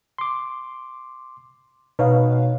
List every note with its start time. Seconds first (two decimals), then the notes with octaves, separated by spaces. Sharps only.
0.18 C6 D6
1.99 B2 D#4 B4 C#5 F5